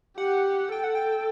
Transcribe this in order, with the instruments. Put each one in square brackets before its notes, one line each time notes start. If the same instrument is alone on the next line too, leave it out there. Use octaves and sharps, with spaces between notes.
[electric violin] G4 [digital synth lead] F#5
[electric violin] A4 [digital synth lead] G5
[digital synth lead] F#5
G5